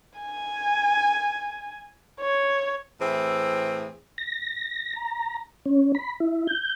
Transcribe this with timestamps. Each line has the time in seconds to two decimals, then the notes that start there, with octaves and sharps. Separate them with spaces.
0.19 G#5
2.20 C#5
3.01 A2 E3 C4 G#4 E5
4.18 A#6
4.93 A#5
5.66 C#4
5.95 B5
6.20 E4
6.47 G6